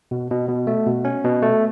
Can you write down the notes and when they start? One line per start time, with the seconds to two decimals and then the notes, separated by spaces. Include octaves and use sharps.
0.11 B2
0.31 B2
0.49 B2
0.67 A3
0.86 B2
1.05 C#4
1.24 B2
1.42 A3